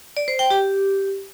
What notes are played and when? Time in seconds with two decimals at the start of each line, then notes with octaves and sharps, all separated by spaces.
0.17 D5
0.28 C5
0.39 G5
0.50 G4